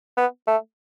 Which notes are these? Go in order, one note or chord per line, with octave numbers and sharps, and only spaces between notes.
B3
A3